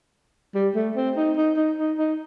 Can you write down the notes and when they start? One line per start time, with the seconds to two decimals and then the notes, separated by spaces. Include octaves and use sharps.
0.55 G3
0.75 A3
0.96 C4
1.17 D#4
1.37 D#4
1.57 D#4
1.78 D#4
1.98 D#4